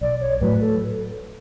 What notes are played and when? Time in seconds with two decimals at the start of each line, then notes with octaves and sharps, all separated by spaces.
0.01 B1 D5
0.21 C#5
0.41 A2 F#3 B4
0.61 A4